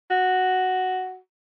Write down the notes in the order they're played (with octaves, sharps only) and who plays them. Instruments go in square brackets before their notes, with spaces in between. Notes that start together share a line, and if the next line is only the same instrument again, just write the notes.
[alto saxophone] F#4